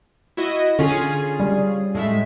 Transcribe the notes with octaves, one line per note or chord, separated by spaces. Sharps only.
E4 F#4 D#5
D3 C#4 F4 G#4
G3
A2 G#3 E5